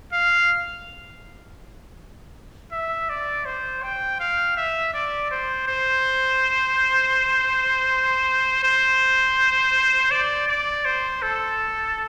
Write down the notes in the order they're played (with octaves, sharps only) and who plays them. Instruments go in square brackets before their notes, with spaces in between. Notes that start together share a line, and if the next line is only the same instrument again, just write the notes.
[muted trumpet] F5
E5
D5
C5
G5
F5
E5
D5
C5
C5
C5
D5
D5
C5
A4